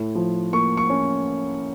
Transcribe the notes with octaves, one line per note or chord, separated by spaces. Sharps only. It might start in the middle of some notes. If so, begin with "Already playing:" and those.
Already playing: A2
F3
A#3 C#6
C#6
C#4